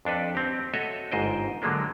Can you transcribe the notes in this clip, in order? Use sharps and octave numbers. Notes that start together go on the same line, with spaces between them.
F2 D4 A4 B4
C4 G4
F#4 A4 C#5 D#5 E5
G1 G#2 C5 D#5 G5
D3 F#3 G#3 A#3 D4